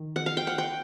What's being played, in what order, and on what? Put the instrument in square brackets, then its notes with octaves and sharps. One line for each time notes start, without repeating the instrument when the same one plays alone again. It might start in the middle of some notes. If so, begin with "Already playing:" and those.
Already playing: [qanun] D#3
F#5
F5
G5
F#5
G5